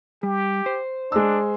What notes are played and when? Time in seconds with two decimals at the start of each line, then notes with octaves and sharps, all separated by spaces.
0.23 G3 G4
0.66 C5
1.12 G#3 D4 E6